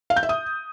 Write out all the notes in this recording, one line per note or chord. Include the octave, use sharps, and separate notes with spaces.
F5
G6
E5
D#6